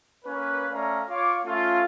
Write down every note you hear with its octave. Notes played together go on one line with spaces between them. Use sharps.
A#3 C#4 B4
A3 C#4 D5 F5 A#5
F4 C#5 F5 D6
A3 C#4 F4